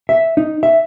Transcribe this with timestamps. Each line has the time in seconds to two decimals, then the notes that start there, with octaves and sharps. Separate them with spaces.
0.09 E5
0.37 D#4
0.63 E5